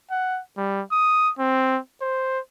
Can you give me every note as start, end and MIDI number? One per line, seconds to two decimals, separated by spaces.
0.11 0.40 78
0.57 0.83 55
0.92 1.31 87
1.39 1.79 60
2.02 2.40 72